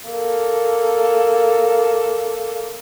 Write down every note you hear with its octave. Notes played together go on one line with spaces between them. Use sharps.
A#3 A4